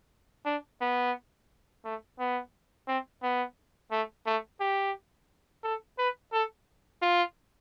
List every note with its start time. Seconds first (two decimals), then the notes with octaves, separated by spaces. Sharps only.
0.46 D4
0.81 B3
1.85 A3
2.20 B3
2.88 C4
3.23 B3
3.92 A3
4.27 A3
4.61 G4
5.64 A4
5.99 B4
6.33 A4
7.02 F4